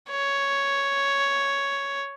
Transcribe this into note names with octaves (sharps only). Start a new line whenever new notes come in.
C#5